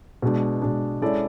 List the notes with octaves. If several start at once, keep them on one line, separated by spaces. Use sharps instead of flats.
B2 G#3 D4
B2 G#3 D4
G#3 C#4 E4 A4 D5